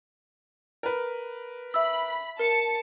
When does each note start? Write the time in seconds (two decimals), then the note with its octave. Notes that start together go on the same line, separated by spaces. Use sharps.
0.83 A#4 B4
1.74 E5 B5 E6
2.39 A#4 A5 C#7